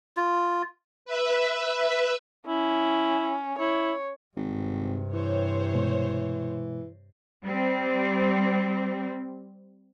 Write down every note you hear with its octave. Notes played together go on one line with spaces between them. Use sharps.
F4
B4 E5
C#4 E4
E4 C#5
G#1 G2 C3
E3 C5 C#5
B2 G#3
G3 C4